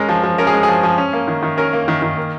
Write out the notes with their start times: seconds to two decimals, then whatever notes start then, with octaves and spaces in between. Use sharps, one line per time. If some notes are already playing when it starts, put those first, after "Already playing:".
Already playing: G#3 C#4 A#4
0.09 F3
0.23 F3
0.38 C#4 A#4
0.47 G#4
0.54 G#3
0.63 G#4
0.68 F3
0.83 F3
0.98 C#4
1.13 A#3
1.28 D#3
1.43 D#3
1.57 C#4 A#4
1.73 A#3
1.88 D#3
2.02 D#3
2.17 A#3